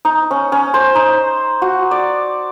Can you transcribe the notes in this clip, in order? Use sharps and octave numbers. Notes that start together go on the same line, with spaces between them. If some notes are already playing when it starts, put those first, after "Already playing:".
D#4
C#4
C#4
C5
D#4
F#4
D5